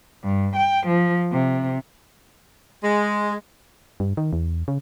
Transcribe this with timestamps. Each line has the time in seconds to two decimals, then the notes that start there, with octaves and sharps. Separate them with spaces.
0.24 G2
0.56 G5
0.87 F3
1.32 C3
2.84 G#3
4.00 G2
4.17 D#3
4.33 E2
4.68 C#3